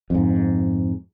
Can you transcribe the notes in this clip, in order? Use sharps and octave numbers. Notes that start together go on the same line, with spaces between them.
F2 G#2